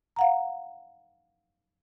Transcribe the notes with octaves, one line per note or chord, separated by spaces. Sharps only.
F5 F#5 A#5